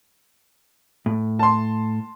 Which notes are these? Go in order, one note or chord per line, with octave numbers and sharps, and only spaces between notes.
A2
A5 C6